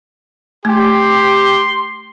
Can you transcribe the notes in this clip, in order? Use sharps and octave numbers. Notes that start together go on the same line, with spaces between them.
A3 G4 C6